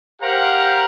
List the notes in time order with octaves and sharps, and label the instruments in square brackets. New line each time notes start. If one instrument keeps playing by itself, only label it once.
[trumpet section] G4 A#4 C5 F5 F#5 A#5